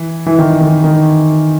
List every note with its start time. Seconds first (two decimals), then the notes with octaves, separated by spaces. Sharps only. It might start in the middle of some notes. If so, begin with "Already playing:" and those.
Already playing: E3
0.26 E3
0.39 D#3
0.60 D#3
0.84 D#3